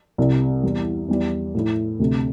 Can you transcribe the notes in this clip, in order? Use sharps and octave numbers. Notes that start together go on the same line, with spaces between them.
C2 C3 G3
E2 E3 G3
E2 E3 G3 E4
A2 A3 E4
D2 C3 A3